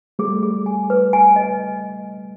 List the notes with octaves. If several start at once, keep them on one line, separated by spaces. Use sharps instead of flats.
G3 A3 G#4
G#4
G#5
B4
G#5
D#5